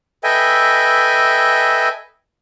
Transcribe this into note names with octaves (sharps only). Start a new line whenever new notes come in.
A4 B4 D#5 E5 G5 G#5